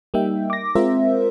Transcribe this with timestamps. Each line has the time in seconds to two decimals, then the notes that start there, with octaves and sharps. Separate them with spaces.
0.14 G3 A#3 D#4 E5 G5
0.50 D6 A#6
0.75 G#3 C4 F4 A#4 C5 E5